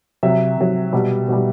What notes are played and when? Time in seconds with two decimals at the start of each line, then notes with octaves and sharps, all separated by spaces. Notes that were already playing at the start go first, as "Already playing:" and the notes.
0.23 C3 F#3 E5
0.58 C3 F#3
0.93 B2 G3
1.28 B2 G3